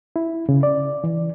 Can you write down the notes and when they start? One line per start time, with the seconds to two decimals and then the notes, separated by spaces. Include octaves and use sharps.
0.16 E4
0.49 C#3
0.63 D5
1.04 E3